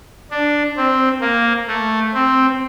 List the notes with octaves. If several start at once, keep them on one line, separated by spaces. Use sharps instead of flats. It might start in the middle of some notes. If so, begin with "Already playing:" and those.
D4
C4
A#3
A3
C4